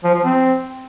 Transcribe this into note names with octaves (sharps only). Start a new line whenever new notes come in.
F3
F3
C4